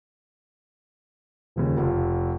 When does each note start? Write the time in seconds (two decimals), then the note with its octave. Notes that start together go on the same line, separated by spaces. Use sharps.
1.56 D#1 D#2 C#3
1.77 F1 F4